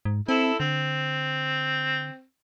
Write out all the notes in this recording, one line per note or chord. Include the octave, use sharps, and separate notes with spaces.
G#2
C4 E4 A4
D3 C4